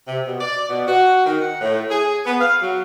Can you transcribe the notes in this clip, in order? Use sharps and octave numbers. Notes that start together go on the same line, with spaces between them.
C3
B2
D5
B2
F#4
D#3
F#5
A2
G#4
B3
F5
F#3